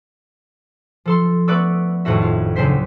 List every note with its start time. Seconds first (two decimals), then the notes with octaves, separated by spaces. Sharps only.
1.05 F3 A4 C6
1.48 A3 B3 B4 D5 C#6 E6
2.05 G#1 F2 A2 F#4 E5
2.22 F4
2.56 D2 C#3 F#3 C4 C5 B6